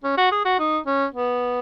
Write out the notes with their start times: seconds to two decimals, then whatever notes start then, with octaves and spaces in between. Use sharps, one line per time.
0.04 C#4
0.17 F#4
0.32 G#4
0.45 F#4
0.59 D#4
0.86 C#4
1.14 B3